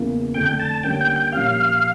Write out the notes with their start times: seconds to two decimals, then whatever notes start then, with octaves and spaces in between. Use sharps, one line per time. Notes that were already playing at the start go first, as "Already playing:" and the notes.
Already playing: E2 C#3 E3 A#3
0.34 F2 D3 A3 D4 A4 G5
0.59 A5
0.83 D3 G3 A#3 C#4 G5
1.01 G5
1.16 G5
1.33 A#2 F3 C#4 G4 F5